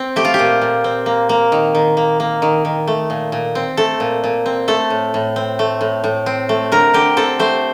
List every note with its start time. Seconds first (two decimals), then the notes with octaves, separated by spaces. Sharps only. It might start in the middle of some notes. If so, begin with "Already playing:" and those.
Already playing: C4
0.16 A3 G4
0.25 F4
0.34 G4
0.39 A#2
0.61 A#2
0.84 C4
1.06 A#3
1.29 A#3
1.52 D#3
1.75 D#3
1.97 A#3
2.20 A#3
2.42 D#3
2.65 D#3
2.87 A3
3.10 A#2
3.32 A#2
3.55 C4
3.77 A3 A4
4.00 A#2
4.24 A#2
4.46 C4
4.68 A3 A4
4.90 A2
5.14 A2
5.36 C4
5.59 A3
5.81 A2
6.04 A2
6.26 C4
6.49 A3
6.72 D3 A#4
6.94 D3 G4
7.17 C4 A4
7.39 A3 C5